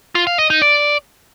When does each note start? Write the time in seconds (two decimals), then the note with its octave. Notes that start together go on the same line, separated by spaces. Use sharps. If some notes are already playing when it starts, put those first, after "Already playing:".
0.15 F4
0.27 F5
0.38 D#5
0.50 D#4
0.62 D5